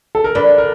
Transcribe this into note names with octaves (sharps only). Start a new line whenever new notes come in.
A4
A#4
D3 D4 B4
A#4